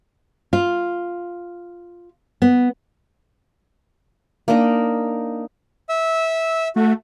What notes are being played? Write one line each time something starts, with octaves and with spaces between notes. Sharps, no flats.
F4
B3
A#3 D4 D#4 D#5
E5 E6
A3 F#4